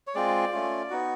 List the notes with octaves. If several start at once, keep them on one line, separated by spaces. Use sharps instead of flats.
C#5
G#3 C4 F4 D5
A3 C#4 F4
B3 D#4 F#4